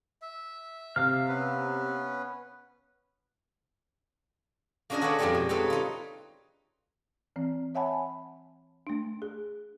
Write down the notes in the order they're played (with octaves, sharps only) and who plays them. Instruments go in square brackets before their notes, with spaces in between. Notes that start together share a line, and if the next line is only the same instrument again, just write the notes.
[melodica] E5
[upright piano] C3 [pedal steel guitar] F5 F6
[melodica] B3 C#4 B4
[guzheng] A#3 C#4 D4 G#4 A#4 D#5
F#4 A4 B4 C#5 D5
F2 G#3 B3 C4 G4 D5
B2
C4 D#4 A4 B4 C#5
D#4 F4
[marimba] E3 C4
C#5 E5 F#5 G#5 A5 B5
A3 D4
G#4